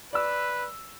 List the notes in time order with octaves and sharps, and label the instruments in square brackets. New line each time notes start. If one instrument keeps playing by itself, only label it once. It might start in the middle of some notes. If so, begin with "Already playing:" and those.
[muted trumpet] B4 [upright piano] D5 E6